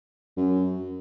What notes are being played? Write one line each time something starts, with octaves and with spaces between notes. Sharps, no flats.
F#2